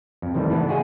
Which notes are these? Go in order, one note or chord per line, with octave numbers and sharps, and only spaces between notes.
F2
C3 D#3 E3 G3 A3
E3 A3 B3 D4 E4
F4 F#4 G#4 D#5 E5 G5